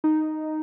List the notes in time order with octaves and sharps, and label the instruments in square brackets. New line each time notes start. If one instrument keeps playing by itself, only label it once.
[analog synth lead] D#4